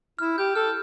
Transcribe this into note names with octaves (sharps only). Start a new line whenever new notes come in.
E4 F6
G4 G6
A4 F6